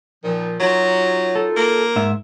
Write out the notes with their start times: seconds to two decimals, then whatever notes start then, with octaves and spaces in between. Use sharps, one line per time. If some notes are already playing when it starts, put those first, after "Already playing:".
0.24 A#2 D#3 F3
0.60 F#2 F#3 D#4 F4
1.35 A4
1.56 A#3
1.96 G#2 E5